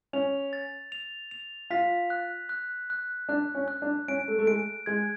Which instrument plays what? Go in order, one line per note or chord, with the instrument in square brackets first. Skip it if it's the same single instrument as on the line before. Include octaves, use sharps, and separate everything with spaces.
[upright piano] C#4 [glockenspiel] F7
[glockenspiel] A6
F7
F7
[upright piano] F4 [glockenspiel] B6
[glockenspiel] F#6
F#6
F#6
[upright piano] D4 [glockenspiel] F#6
[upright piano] C#4
[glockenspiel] F#6
[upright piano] D4
[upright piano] C#4 [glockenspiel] D7
[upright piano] A3
A3
[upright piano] G#3 [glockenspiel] D7
[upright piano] G#3 [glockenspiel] G#6